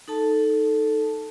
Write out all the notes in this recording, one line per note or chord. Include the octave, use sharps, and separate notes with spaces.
D#4 A4 A5